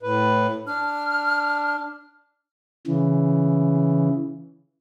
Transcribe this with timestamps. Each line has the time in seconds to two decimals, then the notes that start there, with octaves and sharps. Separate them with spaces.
0.03 A2 B4
0.67 D4 F6
2.87 C#3 E3